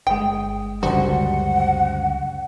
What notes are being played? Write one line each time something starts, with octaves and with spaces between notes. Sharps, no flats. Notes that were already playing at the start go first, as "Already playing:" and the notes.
G1 G#3 G5
C#2 F#2 D3 G3 F#4 C5 F#5 C#7